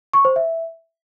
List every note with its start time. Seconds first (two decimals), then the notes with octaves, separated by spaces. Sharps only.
0.13 C#6
0.25 C5
0.36 E5